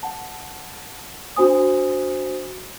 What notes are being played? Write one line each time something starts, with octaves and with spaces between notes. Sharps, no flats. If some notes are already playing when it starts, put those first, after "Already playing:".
F#5 A5
D4 F#4 C5 G#5 D#6